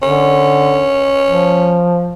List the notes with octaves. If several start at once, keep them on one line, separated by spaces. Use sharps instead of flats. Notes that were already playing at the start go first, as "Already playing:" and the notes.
D3 C#4
F3